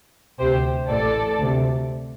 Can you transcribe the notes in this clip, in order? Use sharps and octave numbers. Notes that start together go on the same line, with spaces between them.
D2 C3 G4 C5
A1 A2 A4 D5
D2 C3